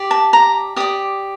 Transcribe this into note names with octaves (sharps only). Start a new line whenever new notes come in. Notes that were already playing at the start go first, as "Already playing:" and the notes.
Already playing: G4 D5
A5
A#5
G4 D5 D#6